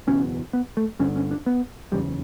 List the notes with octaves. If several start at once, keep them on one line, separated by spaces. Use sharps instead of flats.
F#1 E2 B2 C#4
B3
A3
G1 G2 D3 C#4
C#4
D4
B3
F#1 E2 C#3 G3